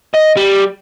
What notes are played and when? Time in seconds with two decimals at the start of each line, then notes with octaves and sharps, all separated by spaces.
0.14 D#5
0.37 G3